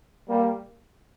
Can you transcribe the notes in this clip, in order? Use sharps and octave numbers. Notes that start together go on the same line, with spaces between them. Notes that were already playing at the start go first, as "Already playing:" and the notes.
G3 A#3